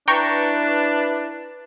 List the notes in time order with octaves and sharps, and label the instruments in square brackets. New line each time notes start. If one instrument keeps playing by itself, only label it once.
[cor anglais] D4 [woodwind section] E4 B4 [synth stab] G5 A#5 C#6